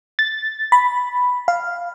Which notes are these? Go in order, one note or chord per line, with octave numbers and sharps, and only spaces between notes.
A6
B5
F5